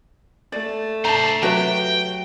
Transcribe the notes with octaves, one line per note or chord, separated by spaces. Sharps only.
A3 D5
D4 C5 A5 A#5
F#3 G4 B4 E5 G5